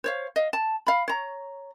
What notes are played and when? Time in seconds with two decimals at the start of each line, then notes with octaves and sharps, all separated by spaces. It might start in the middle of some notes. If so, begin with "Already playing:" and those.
0.04 C5 C#5 F5
0.36 D#5 F5
0.53 A5
0.87 F5 B5
1.08 C#5 A#5